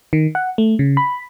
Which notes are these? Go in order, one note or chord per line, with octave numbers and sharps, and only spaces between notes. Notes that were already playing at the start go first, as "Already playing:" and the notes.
D#3
F#5
A3
C#3
B5